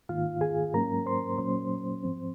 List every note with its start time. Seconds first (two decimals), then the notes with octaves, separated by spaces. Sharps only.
0.09 G#2 D#3 A#3 F4 F5
0.41 G#4 G#5
0.73 G#2 F#3 A#3 C#4 A#4 A#5
1.06 C5 C6
1.38 A#2 F#3 A#3 C#4 C5 C6
2.03 G#2 F3 C4